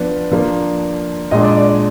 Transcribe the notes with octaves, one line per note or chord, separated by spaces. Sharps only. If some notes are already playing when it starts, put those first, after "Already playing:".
Already playing: F3 B3 D4 B4
F3 A#3 D4
A#2 G#3 D4 D#5
D5
D5
D5